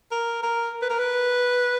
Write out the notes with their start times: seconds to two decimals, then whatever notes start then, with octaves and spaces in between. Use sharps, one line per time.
0.11 A#4
0.43 A#4
0.82 B4
0.90 A#4
0.99 B4